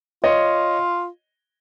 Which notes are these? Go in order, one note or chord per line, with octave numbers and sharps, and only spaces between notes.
F4 C#5 D#5